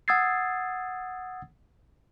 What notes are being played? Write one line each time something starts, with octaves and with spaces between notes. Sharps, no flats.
F#5 D#6 E6 G#6 A6 C7